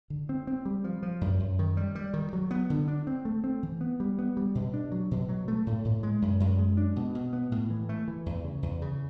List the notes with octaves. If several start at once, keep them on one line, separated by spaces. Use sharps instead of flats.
D3
C4
C4
G3
F3
F3
F#2
F#2
D#3
G3
G3
D#3
F#3
B3
D3
D4
C4
A3
C4
E3
B3
G3
B3
G3
B2
D4
F#3
B2
F#3
A3
A2
A2
G#3
F#2
F#2
G#3
D4
B2
B2
B3
A2
E3
A3
E3
E2
C#3
E2
C#3